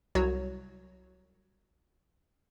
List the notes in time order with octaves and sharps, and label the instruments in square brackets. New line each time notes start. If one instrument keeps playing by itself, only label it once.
[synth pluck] C2 F#3 F#4 C#5